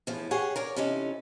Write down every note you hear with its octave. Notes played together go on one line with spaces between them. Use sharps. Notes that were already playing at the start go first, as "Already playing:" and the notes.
E2 A2 F3
G4 G#4 C#5 F5 F#5
A#4 C#5 D5
C3 E3 C#4 D#4 A4